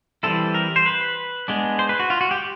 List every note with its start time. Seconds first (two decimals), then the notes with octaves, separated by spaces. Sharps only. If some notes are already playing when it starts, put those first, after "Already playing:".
0.23 E3 G3 C4 E4 A4
0.55 A#4
0.76 C5
0.86 B4
1.48 G#3 B3 D4
1.79 C5
1.89 B4
2.00 F#4
2.10 F4
2.21 F#4
2.31 G4